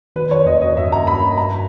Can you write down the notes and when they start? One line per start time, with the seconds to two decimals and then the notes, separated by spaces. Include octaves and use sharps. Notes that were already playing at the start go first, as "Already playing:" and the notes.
0.16 D#3 B4
0.31 C#5
0.46 E2 D#5
0.61 D#5
0.77 G2 E5
0.92 A#5
1.07 B5
1.38 A#5